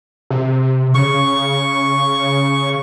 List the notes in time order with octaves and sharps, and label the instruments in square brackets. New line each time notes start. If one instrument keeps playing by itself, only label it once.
[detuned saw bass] C3
[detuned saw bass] C#3 [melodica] C#6